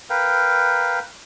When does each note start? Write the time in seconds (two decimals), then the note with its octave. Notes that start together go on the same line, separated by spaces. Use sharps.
0.10 A#4 B4 F5 G5